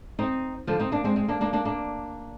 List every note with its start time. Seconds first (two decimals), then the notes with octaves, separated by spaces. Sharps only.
0.19 C4 D#4
0.67 D3 F3
0.79 C4 D#4
0.92 A#3 D4
1.04 G#3 C4
1.16 G#3 C4
1.28 A#3 D4
1.41 A#3 D4
1.53 A#3 D4
1.65 A#3 D4